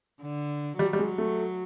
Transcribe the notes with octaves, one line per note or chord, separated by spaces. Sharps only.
D3
F#3 G3
G3
G#3
A3